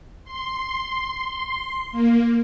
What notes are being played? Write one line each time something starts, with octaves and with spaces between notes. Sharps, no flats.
C6
A#3